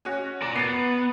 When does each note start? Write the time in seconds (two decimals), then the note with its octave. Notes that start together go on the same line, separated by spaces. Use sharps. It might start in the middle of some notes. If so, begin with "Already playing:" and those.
0.05 C#4 F#4
0.42 A#4 D5
0.56 B3 A6 C7